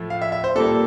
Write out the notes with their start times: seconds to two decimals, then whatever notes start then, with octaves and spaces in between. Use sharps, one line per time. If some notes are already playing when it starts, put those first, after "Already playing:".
Already playing: A2 F3 A3
0.10 F5
0.22 E5
0.32 E5
0.44 C5
0.55 A#2 G3 A#3 A4